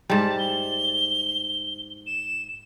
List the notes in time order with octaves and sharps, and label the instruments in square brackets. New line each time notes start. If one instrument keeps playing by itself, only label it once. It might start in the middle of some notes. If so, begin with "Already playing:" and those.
[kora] G#2 G3 [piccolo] A5
[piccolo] G7
E7